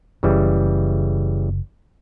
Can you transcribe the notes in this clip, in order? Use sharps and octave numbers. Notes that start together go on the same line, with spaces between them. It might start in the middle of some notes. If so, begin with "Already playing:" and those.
F#1 C#3 E3 G3